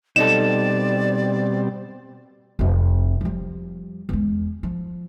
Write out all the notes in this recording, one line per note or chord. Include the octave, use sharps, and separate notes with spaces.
B2 G3 C4 D#4 A4 D5 E7
F1 C4
F3 G3
E2 G#3
F3